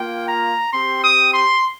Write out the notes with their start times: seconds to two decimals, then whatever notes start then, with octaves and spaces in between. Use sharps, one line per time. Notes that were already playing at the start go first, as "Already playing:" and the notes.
Already playing: A#3 F4 G5
0.28 A#5
0.73 C4 G4 C6
1.04 D#6
1.34 C6